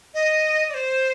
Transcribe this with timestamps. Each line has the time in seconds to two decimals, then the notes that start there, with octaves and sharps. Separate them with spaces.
0.14 D#5
0.69 D5
0.74 C5